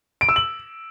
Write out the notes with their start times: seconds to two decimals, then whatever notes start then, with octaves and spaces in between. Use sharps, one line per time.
0.21 D7
0.29 E6
0.36 F#7